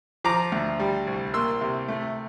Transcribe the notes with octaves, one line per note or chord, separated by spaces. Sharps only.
F3 A#5 D6
D2
G3
C2
A#3 C6 E6
C3
A3